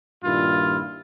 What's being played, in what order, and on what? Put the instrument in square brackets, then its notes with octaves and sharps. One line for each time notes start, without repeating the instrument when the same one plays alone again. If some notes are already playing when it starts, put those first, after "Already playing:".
[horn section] G2 A#2 D#3 E4 F4